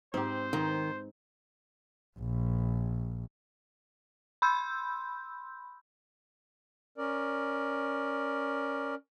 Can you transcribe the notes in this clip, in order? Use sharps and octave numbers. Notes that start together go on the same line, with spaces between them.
G#2 C4 G4 C5
G#2 D#3
A#1
B5 C6 E6 G6
C#4 A#4 D5